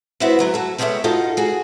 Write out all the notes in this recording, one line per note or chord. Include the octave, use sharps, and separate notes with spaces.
B3 C4 E4 F#4 E5 F#5
D2 F#3 C#5
F#4 A4
G3 G#3 B3 F#4 C#5 E5
D#4 F4 F#4 A4
F#4 G#4